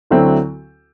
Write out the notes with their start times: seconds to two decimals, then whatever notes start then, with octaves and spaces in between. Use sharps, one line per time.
0.10 D2 D3 F#3 C4 E4